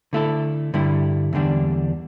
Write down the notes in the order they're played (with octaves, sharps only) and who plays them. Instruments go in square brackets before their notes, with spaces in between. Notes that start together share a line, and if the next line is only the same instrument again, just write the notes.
[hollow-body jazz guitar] D3 A3 E4 A4
G2 D3 G3 E4
E2 D3 G3 D4